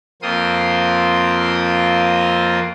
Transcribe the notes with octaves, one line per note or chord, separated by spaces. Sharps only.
F2 A#3 C4 F4 C6 D#6